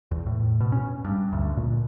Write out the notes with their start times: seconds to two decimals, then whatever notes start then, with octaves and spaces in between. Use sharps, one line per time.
0.11 E2
0.26 A2
0.60 B2
0.72 C#4
1.05 G2
1.33 D2
1.57 A#2